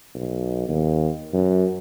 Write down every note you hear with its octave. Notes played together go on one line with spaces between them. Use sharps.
B1
D#2
F#2